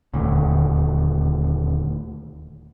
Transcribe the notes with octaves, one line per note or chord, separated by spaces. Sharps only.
D#1 D2